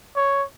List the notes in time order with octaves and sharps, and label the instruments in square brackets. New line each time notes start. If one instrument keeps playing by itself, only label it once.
[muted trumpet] C#5